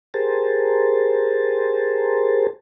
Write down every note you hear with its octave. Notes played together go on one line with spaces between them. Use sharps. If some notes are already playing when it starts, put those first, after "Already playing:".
G4 G#4 A#4 C5 A5